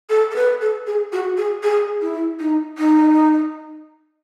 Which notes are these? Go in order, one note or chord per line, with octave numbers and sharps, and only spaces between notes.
A4
A4
B4
A4
G#4
F#4
G#4
G#4
E4
D#4
D#4